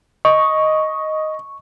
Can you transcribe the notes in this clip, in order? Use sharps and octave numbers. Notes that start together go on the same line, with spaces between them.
D#5 C#6